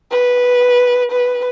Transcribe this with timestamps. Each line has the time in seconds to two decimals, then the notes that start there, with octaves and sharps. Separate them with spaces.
0.12 B4
1.11 B4